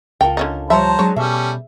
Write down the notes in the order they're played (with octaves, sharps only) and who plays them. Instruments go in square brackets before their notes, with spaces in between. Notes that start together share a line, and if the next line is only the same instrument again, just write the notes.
[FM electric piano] C#2 [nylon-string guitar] F4 A4 A#4 [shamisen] G5
[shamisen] D3 C#4 D#4
[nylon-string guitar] F3 G3 C#5 [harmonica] C5 A5 A#5 [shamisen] E5
[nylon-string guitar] F#3 G#3 D4 [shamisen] C#5
[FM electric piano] B2 [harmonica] G3 C#4 A4 [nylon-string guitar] E5